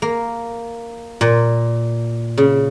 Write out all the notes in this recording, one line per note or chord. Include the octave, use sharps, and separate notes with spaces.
A#3
A#2
C#3